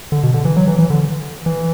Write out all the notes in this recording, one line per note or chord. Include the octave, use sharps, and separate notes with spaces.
D3
B2
D3
E3
F#3
E3
E3
D3
E3